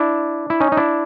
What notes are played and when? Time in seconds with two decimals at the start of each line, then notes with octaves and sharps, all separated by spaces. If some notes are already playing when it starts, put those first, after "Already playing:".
Already playing: D4 E4
0.50 E4
0.60 C#4 D#4
0.72 D#4
0.77 D4 E4